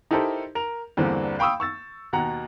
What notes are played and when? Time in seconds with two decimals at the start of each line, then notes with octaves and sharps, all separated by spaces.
0.11 D#4 E4 G4 A4 A#4 C5
0.55 A#4 F7
0.97 E2 G2 D3 E3 A#3 C4
1.39 F5 G5 B5 C#6 D#6 E6
1.60 C#6 E6 A6
2.13 D#2 B2 F#5 A#5